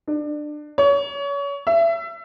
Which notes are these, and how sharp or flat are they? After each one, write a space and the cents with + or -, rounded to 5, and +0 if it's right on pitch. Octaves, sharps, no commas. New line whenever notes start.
D4 +25
C#5 +30
E5 +25